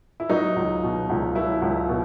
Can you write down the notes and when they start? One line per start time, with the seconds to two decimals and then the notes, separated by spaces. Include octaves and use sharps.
0.20 E4
0.29 F#3 D#4
0.56 C#2
0.83 B2
1.10 C#2
1.35 F#3 E4
1.62 C#2
1.89 B2